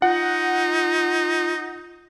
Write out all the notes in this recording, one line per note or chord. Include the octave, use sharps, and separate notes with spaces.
D#4 F4 F#5